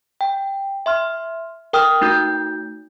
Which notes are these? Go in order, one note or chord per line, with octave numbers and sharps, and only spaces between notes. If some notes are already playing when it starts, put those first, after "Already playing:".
G5
E5 C6 F6
A#4 G5 D#6 F6
A3 D#4 F#4 G6